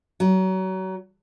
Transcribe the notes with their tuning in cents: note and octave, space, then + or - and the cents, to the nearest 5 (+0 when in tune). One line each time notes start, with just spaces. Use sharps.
F#3 +30